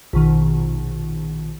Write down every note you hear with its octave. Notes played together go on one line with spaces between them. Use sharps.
A#1 B2 D#3